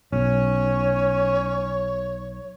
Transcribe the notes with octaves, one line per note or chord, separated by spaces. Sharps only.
B1 C#4 C#5